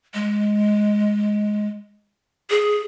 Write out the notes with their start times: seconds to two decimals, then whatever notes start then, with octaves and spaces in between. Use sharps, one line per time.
0.14 G#3
2.50 G#4